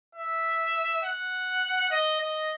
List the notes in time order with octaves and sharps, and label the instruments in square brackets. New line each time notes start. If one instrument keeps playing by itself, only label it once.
[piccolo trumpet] E5
F#5
D#5
D#5